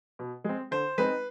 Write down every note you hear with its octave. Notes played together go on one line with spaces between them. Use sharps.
B2
G#3 C4
D3 C5
G#3 C4 D#4 B4